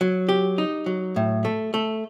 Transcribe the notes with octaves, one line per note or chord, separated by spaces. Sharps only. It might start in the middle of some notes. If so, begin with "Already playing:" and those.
F#3
G4
D#4
F#3
A2
A3
A3